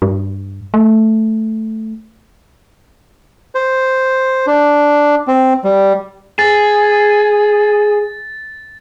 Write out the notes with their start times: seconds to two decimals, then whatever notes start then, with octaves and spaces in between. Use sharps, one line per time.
0.02 G2
0.74 A3
3.55 C5
4.47 D4
5.27 C4
5.64 G3
6.39 G#4 A6